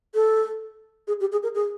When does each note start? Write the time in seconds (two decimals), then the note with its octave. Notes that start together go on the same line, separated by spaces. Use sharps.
0.15 A4
1.08 G#4
1.20 G4
1.32 G#4
1.43 A#4
1.55 G#4